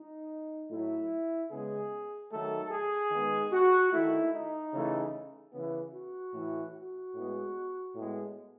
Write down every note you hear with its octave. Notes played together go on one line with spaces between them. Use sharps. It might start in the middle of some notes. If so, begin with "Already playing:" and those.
Already playing: D#4
A2 F#3 A3 E4
C#3 G#3 B3 G#4
D#3 F#3 A3 A4
G#4
D#3 G#3 B3
F#4
D#3 A3 E4
D#4
C#3 E3 A3
C#3 E3 B3
F#4
A2 E3 A3
F#4
A2 G#3 B3
A2 G#3 B3